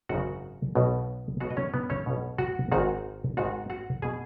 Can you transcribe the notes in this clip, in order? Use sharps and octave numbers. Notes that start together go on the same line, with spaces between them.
G#1 F#2 C#3 F#4 F#5
B1 B2
B1 B2 F#4 F#5
D#5
C#4 C#5
B3 B4
C#4 C#5
B1 B2
F#4 F#5
G#1 G#2 D#3 F#4 F#5
G#1 G#2 D#3 F#4 F#5
F#4 F#5
B2 G#4 G#5